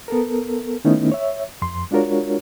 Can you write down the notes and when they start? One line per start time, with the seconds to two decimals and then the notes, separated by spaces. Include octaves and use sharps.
0.08 B3 A4 A#4
0.85 D#3 A3 B3 C#4 D#4 E4
1.12 C#5 E5
1.62 F2 C6
1.91 G#3 D4 F4 F#4 A#4 C#5